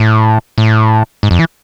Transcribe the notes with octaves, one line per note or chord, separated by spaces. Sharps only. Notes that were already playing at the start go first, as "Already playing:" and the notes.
Already playing: A2
A2
G#2
F2
E3